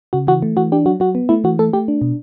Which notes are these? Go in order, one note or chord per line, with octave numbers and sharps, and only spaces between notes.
C#3 F#4
E3 F#4
A3
E3 F#4
D4 G4
F#3 F#4
F#3 F#4
B3
A3 E4
E3 F#4
A3 A4
A3 G4
D4
B2